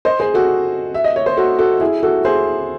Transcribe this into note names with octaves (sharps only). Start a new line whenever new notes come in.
C5 D#5
G#4 C5
F#4 A4
E5
D#5
C#5
C5
F#4 A4
F#4 A4
E4 G#4
F#4 A4
G#4 C5